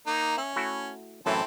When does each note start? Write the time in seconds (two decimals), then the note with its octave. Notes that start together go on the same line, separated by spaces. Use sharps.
0.07 A#3 D#4
0.37 C#4 E5
0.56 A3 E4 F#4
1.26 F#2 A2 E3 C4 E4 A4